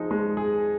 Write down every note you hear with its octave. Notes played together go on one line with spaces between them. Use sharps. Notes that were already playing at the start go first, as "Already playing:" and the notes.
Already playing: F3 G#3 D#4 G#4
G#3
G#4